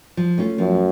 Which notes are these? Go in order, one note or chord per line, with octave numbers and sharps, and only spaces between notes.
F3
A3 C#4 F4
F#2 F3